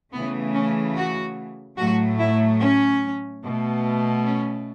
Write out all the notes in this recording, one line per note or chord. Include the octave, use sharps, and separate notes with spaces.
C#3 E3 A3 B3
C#4
F#4
A2 F#3 A3 F#4
E4
C#4
B2 A3
C#4